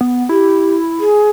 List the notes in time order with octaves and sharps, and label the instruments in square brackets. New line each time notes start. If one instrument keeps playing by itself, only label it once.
[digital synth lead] B3
[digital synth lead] E4 [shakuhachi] G4
[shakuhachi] G#4